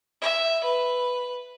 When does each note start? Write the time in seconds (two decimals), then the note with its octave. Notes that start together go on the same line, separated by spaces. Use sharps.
0.22 E5
0.64 B4